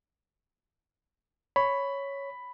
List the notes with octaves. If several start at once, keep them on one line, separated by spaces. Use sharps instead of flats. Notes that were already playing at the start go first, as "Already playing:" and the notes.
C#5 B5